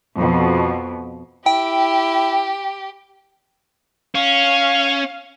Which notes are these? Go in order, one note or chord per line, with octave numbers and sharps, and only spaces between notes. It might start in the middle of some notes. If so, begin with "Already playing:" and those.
F2 B2
E4 G4 G5
C#4 F5